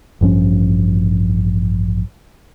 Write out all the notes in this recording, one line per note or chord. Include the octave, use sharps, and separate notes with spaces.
A1 G2 F3 C#4